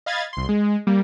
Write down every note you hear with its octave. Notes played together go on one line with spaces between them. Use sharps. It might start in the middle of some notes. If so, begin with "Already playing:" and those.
D#5 F5 B5 G#6 A6
C2 C6
G#3
G3 A#3